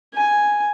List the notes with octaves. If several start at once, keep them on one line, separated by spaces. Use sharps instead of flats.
G#5